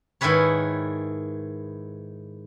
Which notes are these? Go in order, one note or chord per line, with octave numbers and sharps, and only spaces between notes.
G#2 D#3 E4 G#4 B4 C#5